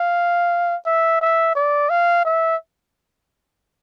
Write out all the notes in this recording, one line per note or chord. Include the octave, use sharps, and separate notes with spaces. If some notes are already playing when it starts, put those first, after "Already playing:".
Already playing: F5
E5
E5
D5
F5
E5